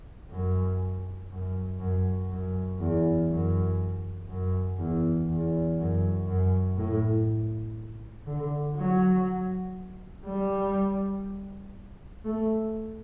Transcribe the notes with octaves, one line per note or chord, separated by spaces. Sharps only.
F#2
F#2
F#2
F#2
E2
F#2
F#2
E2
E2
F#2
F#2
A2
D3
F#3
G3
A3